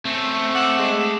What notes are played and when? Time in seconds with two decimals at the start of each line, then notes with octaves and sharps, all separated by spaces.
0.05 A3 C4 C#4
0.55 F#5 D6 E6 E7
0.79 G#3